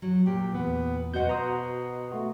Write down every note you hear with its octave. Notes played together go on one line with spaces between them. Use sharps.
F#3
A#2 G4
E2 B3
B2 F#4 C5 D#5 F#5 G6
B2 A#5 C6 D#6
A3 F#4